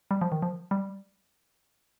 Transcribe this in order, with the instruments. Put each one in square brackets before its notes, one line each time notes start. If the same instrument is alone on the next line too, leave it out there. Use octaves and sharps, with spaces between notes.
[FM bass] G3
F3
D#3
F3
G3